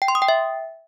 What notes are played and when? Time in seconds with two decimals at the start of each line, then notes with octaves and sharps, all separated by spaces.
0.02 G5
0.08 C6
0.15 D#6
0.22 G5
0.28 E5